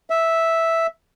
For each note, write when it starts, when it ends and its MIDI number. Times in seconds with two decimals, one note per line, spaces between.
0.10 0.87 76